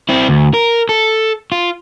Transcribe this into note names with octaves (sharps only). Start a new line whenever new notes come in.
C4 E4
D2
A#4
A4
F4